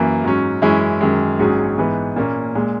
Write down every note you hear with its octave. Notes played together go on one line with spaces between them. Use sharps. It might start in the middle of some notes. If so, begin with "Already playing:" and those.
Already playing: F#2 E3 A#3
G#2 F#3 C#4
F#2 E3 G#3 C#4 E4
F#2 D#3 G#3
A#1 G#2 F#3 C#4 G#4
G#2 E3 B3
A#2 A#3 C#4
A#2 G#3